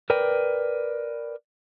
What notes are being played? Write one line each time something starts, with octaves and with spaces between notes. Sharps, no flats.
A#4 B4 D5 G5